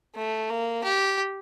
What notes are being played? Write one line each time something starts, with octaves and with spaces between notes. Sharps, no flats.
A3
A#3
G4